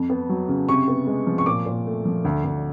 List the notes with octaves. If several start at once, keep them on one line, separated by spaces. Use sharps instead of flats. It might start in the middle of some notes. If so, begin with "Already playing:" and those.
Already playing: F2
B3
F#3
C#3
C3 C#6
B3
G#3
F3
C#6
A#2 D6
A#2
A3
F3
D2
D2